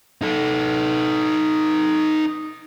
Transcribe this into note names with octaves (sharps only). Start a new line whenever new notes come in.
D#4 A4